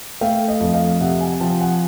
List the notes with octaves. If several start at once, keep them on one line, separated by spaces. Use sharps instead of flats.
A3 F5 G5
D#5 F5
F2
D#5 F5
C3 E5 F#5
F#5 G#5
F3 G5 A5
F#5 G#5